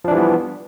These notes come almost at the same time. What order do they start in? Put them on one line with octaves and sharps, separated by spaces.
F3 D4 E3 G3 B3